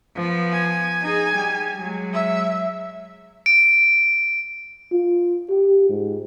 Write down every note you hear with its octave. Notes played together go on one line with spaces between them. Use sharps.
F3 B3
G#5
D#4 G#4
G3
F#3 G#3
E5
D7
F4
G4
G#2